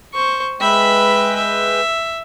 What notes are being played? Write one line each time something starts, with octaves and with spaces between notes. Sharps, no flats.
C5 C#6
G#3 B4 E5 G5 B5
E5